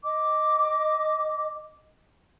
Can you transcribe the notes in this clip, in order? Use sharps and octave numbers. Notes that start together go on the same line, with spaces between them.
D#5 D6